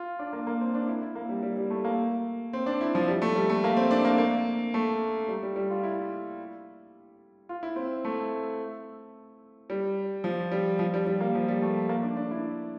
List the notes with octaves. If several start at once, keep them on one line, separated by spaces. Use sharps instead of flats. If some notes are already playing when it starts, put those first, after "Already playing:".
Already playing: F4
D4
A#3
A#3
C4
D4
E4
E4
A#3
G3
G3
G3
A3
A#3
C4
D4
E4
F3
G3
A3
G3
A3
A#3
C4
D4
A#3
A#3
A3
G3
G3
G3
F4
E4
F4
E4
C4
A3
G3
F3
G3
F3
G3
G3
A#3
F3
G3
A3
A#3
D4
D4
E4